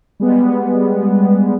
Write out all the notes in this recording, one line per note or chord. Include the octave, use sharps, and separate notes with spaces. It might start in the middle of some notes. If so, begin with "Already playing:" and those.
G3 G#3 B3